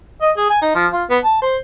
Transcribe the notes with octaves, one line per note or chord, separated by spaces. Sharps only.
D#5
G#4
G#5
D#4
F3
F4
B3
A5
C5